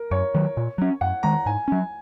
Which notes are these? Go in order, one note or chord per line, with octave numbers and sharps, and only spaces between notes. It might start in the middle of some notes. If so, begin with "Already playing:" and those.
Already playing: A#4
F#2 C#5
D#3 F#3
A#2
F#3 C#4
F#2 F#5
D#3 G#3 A#5
G#2 G#5
F#3 C#4